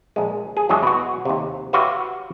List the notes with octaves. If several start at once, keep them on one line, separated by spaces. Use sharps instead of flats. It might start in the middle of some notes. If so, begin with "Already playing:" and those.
A#1 G#3
G#4
E2 F#3 G#3 F#4 G#4 A5
B2 F#4
D#2 C3
F#4 G4 B4 C#5 E5 F5